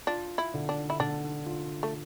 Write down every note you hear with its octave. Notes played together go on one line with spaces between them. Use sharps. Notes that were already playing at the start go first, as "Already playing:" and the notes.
D4 F4
E4
D3
D4
E4
D3 D4
F4
A3